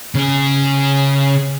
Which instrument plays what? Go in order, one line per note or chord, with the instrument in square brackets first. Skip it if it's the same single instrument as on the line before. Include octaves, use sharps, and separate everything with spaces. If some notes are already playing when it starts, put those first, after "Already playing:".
[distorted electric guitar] C#3 G#4